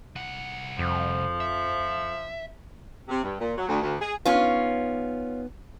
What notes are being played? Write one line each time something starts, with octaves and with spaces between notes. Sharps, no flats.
C2 F#5
F2 F3
E5
C3
G2
A#2
F#3
D2
D2
G#4
B3 C#4 D#4 F4 B4